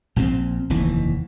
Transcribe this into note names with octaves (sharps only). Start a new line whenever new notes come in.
A#1 A#2 D3 C4
F1 D#2 E3